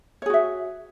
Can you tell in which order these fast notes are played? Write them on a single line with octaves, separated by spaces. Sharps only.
C#5 G#4 F#4 E5